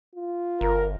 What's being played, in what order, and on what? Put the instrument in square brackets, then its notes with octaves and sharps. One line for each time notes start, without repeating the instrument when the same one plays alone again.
[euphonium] F4
[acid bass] G1 [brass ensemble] A#4